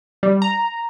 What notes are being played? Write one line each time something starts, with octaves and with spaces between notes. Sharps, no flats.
G3
A#5